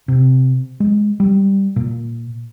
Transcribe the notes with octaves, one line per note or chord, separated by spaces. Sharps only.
C3
G#3
G3
A#2